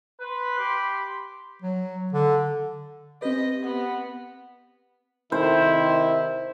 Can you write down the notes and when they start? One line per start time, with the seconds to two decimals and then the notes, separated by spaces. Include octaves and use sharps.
0.20 B4 B5 C6
0.58 G4
1.62 F#3
2.13 D3
3.22 C4 G4 B4 D#5
3.64 B3 F#5
5.32 C3 D#3 E4 C5